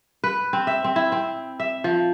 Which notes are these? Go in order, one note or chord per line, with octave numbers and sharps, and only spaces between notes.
B4
C4
E5
C4
E4
C4
E5
F3